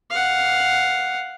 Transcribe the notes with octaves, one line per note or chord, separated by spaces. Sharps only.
F5 F#5